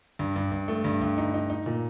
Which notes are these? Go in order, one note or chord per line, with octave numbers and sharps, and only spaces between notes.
G2
G2
G2
A3
G2
G2
D#4
D#4
D#4
A#2